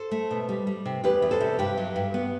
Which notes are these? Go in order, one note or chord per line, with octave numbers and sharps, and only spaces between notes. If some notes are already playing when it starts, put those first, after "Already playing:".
Already playing: A4 C5
A3
B2
G3
G3
C3
E2 G4 B4
E2
A4 C5
C3
G2 G4 B4
F#3
G2
B3